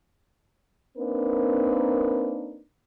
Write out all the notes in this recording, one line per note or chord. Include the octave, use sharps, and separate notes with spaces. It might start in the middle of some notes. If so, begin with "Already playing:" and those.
A#3 C4 D4 D#4 A#4 B4